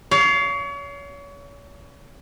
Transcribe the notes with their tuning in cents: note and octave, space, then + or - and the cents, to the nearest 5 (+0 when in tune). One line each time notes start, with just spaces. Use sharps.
C#5 +35 F5 +0